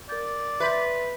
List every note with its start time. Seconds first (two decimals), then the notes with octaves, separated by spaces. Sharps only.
0.09 A#4 D5 G6
0.60 B4 E5 C6 G6